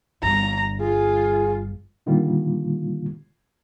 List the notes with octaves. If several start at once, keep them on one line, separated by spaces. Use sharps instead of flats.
G1 G2 A#5
F4 G#4
A#2 D3 D#3 G3 A#3 F4